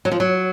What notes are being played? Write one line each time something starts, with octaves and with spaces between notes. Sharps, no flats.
F#3
F3
F#3